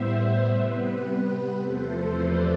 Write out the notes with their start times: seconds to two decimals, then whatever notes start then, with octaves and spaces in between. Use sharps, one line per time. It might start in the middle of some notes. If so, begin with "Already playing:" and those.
Already playing: A2 G3 B3 C5 E5
0.45 C3 G3 B3 B4
1.02 B4
1.30 B4
1.58 E2 C3 F3 A3 A4 C5
2.14 B4 D5